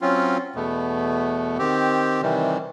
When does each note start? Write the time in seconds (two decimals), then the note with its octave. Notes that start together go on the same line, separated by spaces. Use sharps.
0.01 F#3 C4 C#4 F4
0.55 E2 B2 A3 B3
1.59 D#3 C4 G4
2.22 C3 D#3 E3 G3